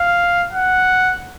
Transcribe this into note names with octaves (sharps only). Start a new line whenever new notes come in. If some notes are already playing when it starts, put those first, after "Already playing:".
Already playing: F5
F#5